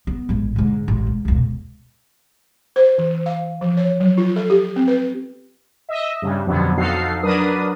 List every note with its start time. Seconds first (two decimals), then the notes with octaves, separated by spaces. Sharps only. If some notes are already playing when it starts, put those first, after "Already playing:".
0.07 B3
0.29 A1 G#2
0.56 G#2 D3
0.88 A1
1.07 G#2
1.25 E1 C#2
2.76 C5
2.98 E3
3.26 F5
3.61 F3
3.77 C#5
4.00 F#3
4.18 F4
4.36 A4
4.50 G4
4.76 C4
4.88 B4
5.89 D#5 E5
6.22 G2 C#3 G3
6.47 F2 B2 D3 F3 F#3 B3
6.77 F2 D#4 F#4 A4 F5 C7
7.23 F#3 D4 A#4 B4 D#6